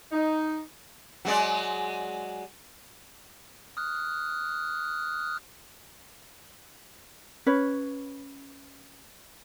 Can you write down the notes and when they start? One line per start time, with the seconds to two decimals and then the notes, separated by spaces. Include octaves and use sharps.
0.12 D#4
1.25 F#3 G#3 D5
3.77 D#6 F6 F#6
7.46 C#4 B4 C#5